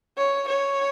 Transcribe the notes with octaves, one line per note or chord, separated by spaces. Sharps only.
C#5
C#5